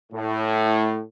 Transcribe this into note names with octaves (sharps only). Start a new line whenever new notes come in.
A2